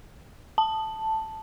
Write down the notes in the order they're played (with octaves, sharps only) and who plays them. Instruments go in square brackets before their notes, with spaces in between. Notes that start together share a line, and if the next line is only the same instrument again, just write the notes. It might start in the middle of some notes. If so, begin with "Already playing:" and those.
[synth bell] A5